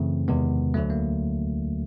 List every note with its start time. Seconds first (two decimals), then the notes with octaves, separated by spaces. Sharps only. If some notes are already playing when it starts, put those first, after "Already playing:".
Already playing: F#2 C#3 E3 A3 C4
0.28 E2 C3 D#3 G#3 B3
0.74 D2 D3 F#3 A3
0.90 A#3